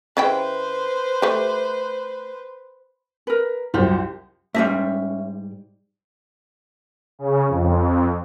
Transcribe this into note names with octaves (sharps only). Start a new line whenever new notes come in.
C#3 E4 B4 C5 G5
A3 G4
A#4 B4
C2 F#2 F4 G4 C5
G#2 G3 C#4 D#4 E5
C#3
F2